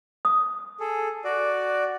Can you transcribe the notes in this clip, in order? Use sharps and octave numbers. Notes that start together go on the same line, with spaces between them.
D#6
G#4 A4
F#4 D5